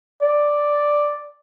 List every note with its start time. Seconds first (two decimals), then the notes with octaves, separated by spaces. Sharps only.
0.23 D5